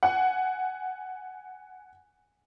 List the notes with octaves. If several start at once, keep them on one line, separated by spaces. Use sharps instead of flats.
F#5 G#5